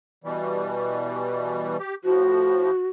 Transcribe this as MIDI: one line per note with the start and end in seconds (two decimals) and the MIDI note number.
0.24 1.77 47
0.24 1.77 52
0.24 1.77 55
1.79 1.95 67
2.04 2.71 45
2.04 2.71 53
2.04 2.88 66